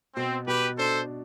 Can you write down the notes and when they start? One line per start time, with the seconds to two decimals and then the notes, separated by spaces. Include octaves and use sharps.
0.16 B2 C4
0.47 B2 G4 B4
0.78 D4 A4 C5